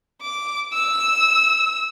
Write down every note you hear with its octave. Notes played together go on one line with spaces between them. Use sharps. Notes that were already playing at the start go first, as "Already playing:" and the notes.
D6
E6